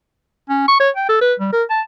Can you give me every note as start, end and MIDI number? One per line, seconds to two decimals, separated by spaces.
0.49 0.66 61
0.68 0.78 85
0.80 0.90 73
0.96 1.06 79
1.09 1.21 69
1.21 1.34 71
1.40 1.52 55
1.52 1.63 70
1.70 1.81 81